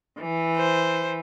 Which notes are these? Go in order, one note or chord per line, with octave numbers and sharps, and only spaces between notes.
E3
C5